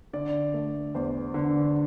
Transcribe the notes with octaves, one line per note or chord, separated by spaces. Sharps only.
D3 D5
A3
E2 C5
D3